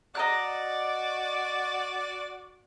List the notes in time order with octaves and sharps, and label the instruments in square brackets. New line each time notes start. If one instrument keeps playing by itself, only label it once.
[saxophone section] F#4 D5 [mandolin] D#5 A#5 F#6